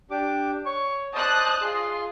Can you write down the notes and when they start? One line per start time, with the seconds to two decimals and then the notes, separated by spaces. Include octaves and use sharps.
0.11 D4 G4 D6
0.66 C#5 C#6
1.15 C5 D5 D#5 A5 D#6 F#6
1.61 F4 G#4 C6